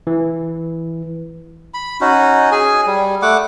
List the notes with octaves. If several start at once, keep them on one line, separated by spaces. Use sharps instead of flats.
E3
B5
C#4 D#4 F#4
G#4 G#5
G3
A3 F#5 D6